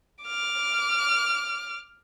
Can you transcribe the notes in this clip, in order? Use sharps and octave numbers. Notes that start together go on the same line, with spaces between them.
D6 F6